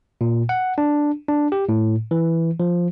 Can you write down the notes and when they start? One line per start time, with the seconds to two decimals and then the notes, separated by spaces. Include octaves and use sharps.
0.21 A#2
0.49 F#5
0.78 D4
1.28 D4
1.52 G4
1.69 A2
2.11 E3
2.60 F3